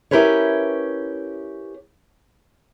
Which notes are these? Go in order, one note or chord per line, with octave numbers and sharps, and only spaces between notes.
C#4 E4 G4 A#4 B4 C#5